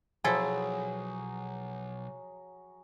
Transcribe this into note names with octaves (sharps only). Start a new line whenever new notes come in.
B1 F3 F#3 E4 G#4 A4 G#5